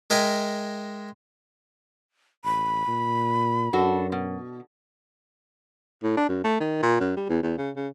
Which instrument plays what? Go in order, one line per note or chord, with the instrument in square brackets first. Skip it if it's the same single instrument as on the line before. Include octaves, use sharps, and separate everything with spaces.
[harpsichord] G#3 A#4 E5 G5 G#5
[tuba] A1 [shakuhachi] B5
[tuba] A#2
[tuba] F#2 [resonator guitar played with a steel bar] D4 F#4 A4
[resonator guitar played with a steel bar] B2
[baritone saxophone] A2
D4
F#2
A3
D#3
A#2
F#2
G3
E2
E2
C#3
C#3